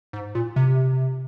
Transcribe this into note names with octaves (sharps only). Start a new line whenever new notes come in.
G#2
A#2
C3